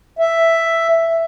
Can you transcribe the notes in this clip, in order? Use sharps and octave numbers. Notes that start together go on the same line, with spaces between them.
E5